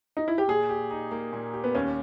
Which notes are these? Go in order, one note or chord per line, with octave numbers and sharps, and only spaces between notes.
D#4
E4
G4
A#2 G#4
G4
D#4
A#3
A#2
G4
B3
D#2 C#4